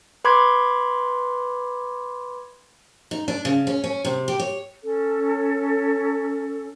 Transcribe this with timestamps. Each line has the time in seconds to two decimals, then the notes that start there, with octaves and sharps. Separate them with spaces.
0.25 B4 B5 C6 D6 G#6
3.11 D#4
3.28 D4
3.45 C#3
3.67 C#4
3.84 C#4
4.05 C3
4.28 G4
4.40 C#5
4.84 C#4 A4